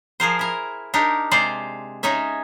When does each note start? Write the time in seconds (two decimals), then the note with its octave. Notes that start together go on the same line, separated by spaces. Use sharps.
0.20 F3 G#4 A#4 C5
0.39 E4 A#4
0.94 D4 D#4 G4 A#4
1.31 C3 G#3 C5 D5 F5
2.03 G#3 C#4 D#4 C#5 E5